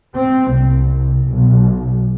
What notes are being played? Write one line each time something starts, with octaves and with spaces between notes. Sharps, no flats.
C4
C2
B1